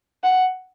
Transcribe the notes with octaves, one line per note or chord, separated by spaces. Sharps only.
F#5